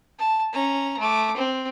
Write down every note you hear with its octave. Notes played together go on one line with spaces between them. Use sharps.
A5
C#4 A#5
A3 D6
C4